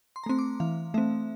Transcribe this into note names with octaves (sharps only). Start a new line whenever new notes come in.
C6
A#5
A3 C4 C6
D6
E3 F5
A3 C4 E5